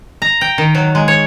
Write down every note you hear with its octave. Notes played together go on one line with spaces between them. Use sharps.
A#5
G5
D#3
F#3
G#3
C#5